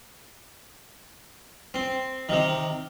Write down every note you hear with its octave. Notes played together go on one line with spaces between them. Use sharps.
C4
C3 D#3